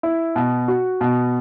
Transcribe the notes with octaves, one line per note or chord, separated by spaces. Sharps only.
E4
B2
F#4
B2